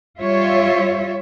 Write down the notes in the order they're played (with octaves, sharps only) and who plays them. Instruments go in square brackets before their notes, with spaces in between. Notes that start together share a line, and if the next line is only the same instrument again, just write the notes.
[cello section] G3 F4 C#5 E5